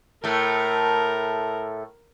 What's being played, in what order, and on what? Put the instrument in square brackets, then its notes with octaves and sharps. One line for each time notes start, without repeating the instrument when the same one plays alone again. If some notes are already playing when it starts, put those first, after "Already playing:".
[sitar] A2 A3 [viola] A#4